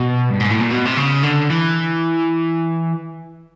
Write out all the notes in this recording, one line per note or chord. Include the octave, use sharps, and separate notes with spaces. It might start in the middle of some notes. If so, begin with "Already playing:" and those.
Already playing: B2
G2
G#2
A2
A#2
B2
C3
C#3
D3
E3